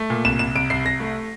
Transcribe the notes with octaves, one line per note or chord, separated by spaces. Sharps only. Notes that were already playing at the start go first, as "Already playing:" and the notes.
Already playing: A3
A#2
C2 E7
C2 E7
C2 D7
C2 C7
C2 A#6
A3